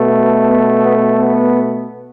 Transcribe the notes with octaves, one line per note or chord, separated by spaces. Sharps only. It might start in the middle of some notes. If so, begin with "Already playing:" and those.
Already playing: B2 A3
B3
B3
B3